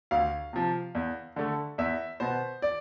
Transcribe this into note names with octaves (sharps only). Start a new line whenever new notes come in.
D2 F5
C3 F3
E2
D3 A3
E2 E5
B2 B3 C5
D5